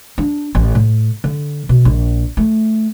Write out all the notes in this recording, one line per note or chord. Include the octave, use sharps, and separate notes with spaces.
D4
A1
A2
D3
B2
A#1
A3